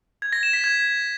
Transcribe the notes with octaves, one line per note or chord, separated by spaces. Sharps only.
G#6
A#6
E7
B6
G#6